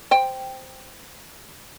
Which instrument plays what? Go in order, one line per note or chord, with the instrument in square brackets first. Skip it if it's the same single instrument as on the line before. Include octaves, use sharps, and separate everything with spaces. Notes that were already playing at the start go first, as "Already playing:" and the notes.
[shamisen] C5 G5